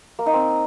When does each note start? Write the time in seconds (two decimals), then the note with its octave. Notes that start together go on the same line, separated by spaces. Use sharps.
0.19 A#3
0.26 D#4
0.34 C4